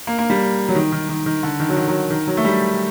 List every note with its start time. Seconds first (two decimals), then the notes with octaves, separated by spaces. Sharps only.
0.07 A#3
0.19 A#3
0.30 G3
0.69 F#3
0.75 D#3
0.92 D#3
1.09 D#3
1.26 D#3
1.43 D3
1.60 D#3
1.69 F#3
1.77 D#3
1.88 F#3
2.10 D#3
2.27 F#3
2.37 A3
2.45 G3